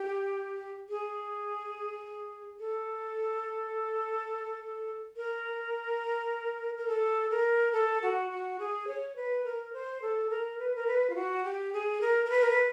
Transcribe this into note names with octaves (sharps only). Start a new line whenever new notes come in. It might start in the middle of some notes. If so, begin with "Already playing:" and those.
Already playing: G4
G#4
A4
A#4
A#4
A4
A#4
A4
F#4
F#4
G#4
C#5
B4
A#4
C5
A4
A#4
B4
A#4
B4
F4
F#4
G4
G#4
A#4
A#4
B4
A#4
B4